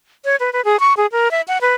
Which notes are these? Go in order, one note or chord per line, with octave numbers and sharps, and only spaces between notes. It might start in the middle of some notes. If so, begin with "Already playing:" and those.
C#5
B4
B4
G#4
C#6
G#4
A#4
E5
F#5
B4